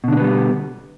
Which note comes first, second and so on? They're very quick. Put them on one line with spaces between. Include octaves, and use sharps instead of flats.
B2 D3 D4 B3 G3